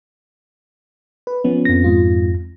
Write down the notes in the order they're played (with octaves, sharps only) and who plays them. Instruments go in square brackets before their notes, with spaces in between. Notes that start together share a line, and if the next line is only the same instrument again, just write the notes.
[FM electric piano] B4
F3 B3 C#4
[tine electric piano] F2 A#6
[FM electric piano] G#2 F4